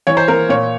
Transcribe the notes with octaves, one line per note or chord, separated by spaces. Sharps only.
E3 C#5
C5
A#3 A#4
A#2 C#5